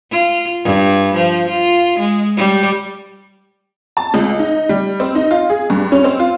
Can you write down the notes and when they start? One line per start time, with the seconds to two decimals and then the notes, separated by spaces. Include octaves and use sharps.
0.11 F4
0.64 G2
1.16 F3
1.49 F4
1.99 G#3
2.37 G3
3.97 A5
4.14 C#2
4.39 D#4
4.69 G3
5.00 C4
5.15 D#4
5.31 F4
5.50 G#4
5.70 G2
5.92 C#4
6.04 C4
6.19 F4